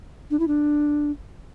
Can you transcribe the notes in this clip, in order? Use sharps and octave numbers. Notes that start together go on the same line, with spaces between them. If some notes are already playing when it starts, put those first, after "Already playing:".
D4
E4
D4